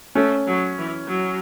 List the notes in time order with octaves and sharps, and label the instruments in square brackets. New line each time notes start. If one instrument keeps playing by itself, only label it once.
[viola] A3 [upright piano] C#4
[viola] F#3
E3
F#3